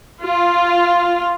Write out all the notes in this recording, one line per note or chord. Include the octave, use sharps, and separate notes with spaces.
F4